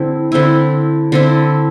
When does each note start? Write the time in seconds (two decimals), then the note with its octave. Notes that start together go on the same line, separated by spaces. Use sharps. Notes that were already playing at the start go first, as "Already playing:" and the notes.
Already playing: D3 C4 E4
0.32 D3 C4 E4
1.12 D3 C4 E4